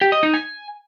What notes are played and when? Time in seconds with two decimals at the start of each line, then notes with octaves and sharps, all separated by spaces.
0.01 G4
0.12 D#5
0.23 D#4
0.34 G#5